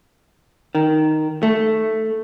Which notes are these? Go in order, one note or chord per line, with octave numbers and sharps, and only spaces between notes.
D#3
A3